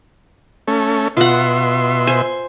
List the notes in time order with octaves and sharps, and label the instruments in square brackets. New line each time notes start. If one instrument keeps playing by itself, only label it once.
[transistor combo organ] A3 C#4
[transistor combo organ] B2 E5 C6 [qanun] F4 F#5
[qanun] C5 G#5